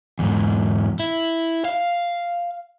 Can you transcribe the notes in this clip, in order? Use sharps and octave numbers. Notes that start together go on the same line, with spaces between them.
E2 G#2
E4
F5